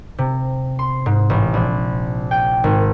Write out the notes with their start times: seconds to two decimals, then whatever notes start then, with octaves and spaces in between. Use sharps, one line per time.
0.18 C3
0.79 C6
1.06 G#2
1.30 A1
1.54 A#1
2.31 G5
2.64 G#1